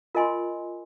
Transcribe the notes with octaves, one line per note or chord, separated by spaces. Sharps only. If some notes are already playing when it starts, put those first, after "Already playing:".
F4 A#4 D#5 G#5 C6